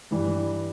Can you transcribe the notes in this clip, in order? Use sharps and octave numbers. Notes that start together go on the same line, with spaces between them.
G2 E3 G3